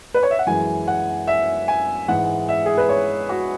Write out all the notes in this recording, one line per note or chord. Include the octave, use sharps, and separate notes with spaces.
B4
C#5
E5
F#5
F#2 E3 G#3 G#5
F#5
E5
G#5
G#2 E3 G#3 F#5
E5
G#4
B4
C#5
F#4